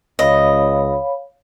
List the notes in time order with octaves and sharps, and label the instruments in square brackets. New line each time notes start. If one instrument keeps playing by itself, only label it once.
[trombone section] C#2 [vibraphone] C#5 F5 B5 [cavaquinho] D#5